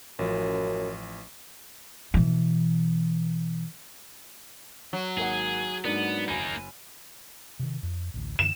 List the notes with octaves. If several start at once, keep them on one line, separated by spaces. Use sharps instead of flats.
A1 F#2 F3
B2 E3
F#3
G#1 A#3 G#4 F#5
G#2 A#3 B3 D4
F#1 A#3 D#4 G#5 B5
C3 D#3
F2
A1 D2
F#2 D3 E3 E7